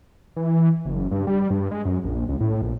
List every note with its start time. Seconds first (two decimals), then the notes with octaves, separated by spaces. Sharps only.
0.36 E3
0.85 F#1
1.11 G2
1.27 G3
1.50 G2
1.71 G#3
1.85 F#2
2.04 A#1
2.29 C#2
2.40 A2
2.62 A#1